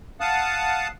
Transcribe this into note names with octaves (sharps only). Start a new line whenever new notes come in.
F5 F#5 A5 D#6